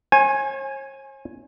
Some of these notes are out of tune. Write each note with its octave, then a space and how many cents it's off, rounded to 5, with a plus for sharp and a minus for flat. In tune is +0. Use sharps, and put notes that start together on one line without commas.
C#5 -45 G#5 +0